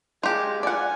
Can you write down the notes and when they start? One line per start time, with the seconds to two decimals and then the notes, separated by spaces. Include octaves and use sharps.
0.23 G#3 F4 G4
0.63 F4 D5 F#5 G#5